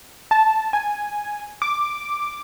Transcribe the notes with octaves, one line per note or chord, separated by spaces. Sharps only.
A5
G#5
D6